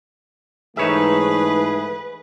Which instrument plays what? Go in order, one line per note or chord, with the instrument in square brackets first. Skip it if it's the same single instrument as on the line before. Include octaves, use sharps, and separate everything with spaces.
[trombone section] G#2 E3 A3 [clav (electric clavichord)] D#4 C#5 E5 [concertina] G#4 [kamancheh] B4